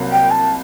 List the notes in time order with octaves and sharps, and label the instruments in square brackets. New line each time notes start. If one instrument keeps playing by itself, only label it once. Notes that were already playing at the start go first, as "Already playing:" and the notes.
Already playing: [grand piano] C2 C3 F#3 A#3
[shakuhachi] G5
A5